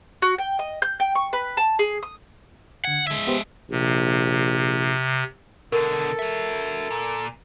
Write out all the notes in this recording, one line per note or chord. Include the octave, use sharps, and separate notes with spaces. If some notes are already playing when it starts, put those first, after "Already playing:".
F#4
G5
D#5
G6
G5
C#6
B4
A5
G#4
D#6
D3 F#5 G#6
G#3 E5
B3 G4 C5
A#1 C3
B2 D3 A4 A#4
F#4 E5
A#2